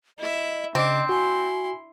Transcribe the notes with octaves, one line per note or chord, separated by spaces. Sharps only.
E4 D#5 E5
C#3 C4 D4 D#5 D6
E4 F#4 G#5 C6